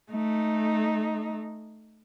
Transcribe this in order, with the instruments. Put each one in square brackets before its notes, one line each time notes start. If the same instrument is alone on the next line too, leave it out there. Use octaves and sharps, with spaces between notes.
[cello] A3 D#4